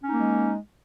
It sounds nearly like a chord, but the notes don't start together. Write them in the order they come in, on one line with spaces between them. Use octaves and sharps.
C#4 D#4 A#3 G#3